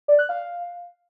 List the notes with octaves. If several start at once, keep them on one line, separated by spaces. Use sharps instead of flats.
D5
F#6
F5